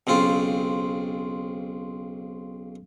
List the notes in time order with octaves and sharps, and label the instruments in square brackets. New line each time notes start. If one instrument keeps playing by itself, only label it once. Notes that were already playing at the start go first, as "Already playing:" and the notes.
[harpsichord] B1 C#3 C4 F4